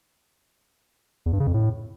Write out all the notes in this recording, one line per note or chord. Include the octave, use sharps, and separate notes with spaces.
E2
G2
C#3
F2
A2